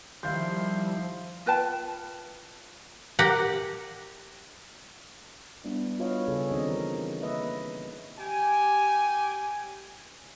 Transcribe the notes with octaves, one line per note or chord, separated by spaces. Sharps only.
D#3 F3 G3 E4 E5 F5 C6 G6
F4 B4 G5 A5
G4 A#4 F#5
G3 B3 D4 E4
F4 F#4 B4 C#5 D#5 F5
C#3 G#4 A4 C#5
D#3 C4 D4 F4 D#5
E3 A#4
A#3 B4 D#5 E5
G4 G#5